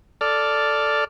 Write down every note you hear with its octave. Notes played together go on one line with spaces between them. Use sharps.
A4 D5 F6